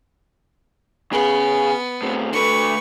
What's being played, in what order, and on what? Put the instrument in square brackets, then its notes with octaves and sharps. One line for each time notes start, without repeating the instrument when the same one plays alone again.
[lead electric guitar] C#3 G#4 [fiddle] B3
[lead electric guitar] A2 C4
[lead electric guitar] D3 A3 [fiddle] B4 C#6